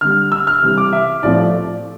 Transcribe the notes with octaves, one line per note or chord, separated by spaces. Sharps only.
D3 G3 F6
E6
F6
C3 E3 G3
D6
E5
A2 F3 A3 D5